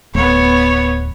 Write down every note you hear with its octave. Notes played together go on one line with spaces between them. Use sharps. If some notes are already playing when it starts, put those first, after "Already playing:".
D1 D2 A3 B3 C#5